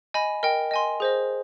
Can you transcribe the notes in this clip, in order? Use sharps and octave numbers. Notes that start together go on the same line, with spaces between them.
D#5 G#5 B5
A#4 D#5 G5
D#5 G#5 C6
G#4 C5 D#5